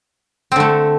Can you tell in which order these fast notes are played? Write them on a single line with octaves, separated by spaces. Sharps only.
C4 D3 A3